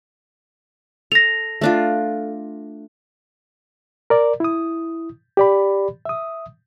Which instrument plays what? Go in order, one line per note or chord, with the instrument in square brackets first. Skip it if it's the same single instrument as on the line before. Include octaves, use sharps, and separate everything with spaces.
[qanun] A4 [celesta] A#6 F7
[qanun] A3 D4 F4
[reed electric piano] A#4 D5
E4 D#6
G4 D5 B5
E5 D#6